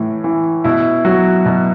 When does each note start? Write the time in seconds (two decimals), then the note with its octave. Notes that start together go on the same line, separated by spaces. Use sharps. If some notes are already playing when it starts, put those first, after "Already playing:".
Already playing: A2 E3
0.24 E3
0.64 B2 E4
1.05 F#3 F#4
1.46 B2